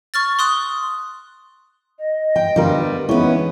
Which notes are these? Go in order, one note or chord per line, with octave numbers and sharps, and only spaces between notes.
C#6 F6 A6
C6 D#6 F#6
D#5
G5
D3 G3 B3 F4 A#4
E3 G#3 B3 C#4 D#4 E4